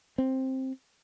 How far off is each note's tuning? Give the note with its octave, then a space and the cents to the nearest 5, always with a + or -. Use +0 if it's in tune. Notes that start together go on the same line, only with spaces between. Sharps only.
C4 +10